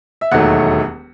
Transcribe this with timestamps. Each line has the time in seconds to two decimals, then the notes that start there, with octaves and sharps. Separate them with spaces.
0.21 E5
0.31 E1 D#2 D#3 F#3 A3 F#5